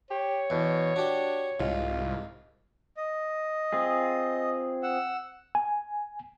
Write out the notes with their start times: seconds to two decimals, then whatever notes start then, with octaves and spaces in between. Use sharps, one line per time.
0.11 G4 C#5
0.50 E2 B2
0.96 D4 F#4 G4
1.60 C2 G#2 F4
2.97 D#5
3.73 C4 F4 G#4
4.83 F#5 E6
5.55 G#5